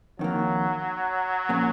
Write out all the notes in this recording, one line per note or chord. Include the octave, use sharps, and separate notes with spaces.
F2 D#3 F#3 A#3
A#2 F3 A#3 C#4